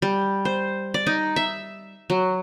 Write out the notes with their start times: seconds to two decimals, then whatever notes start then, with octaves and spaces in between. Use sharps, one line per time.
0.02 G3
0.45 C5
0.94 D5
1.07 D#4
1.36 E5
2.10 F#3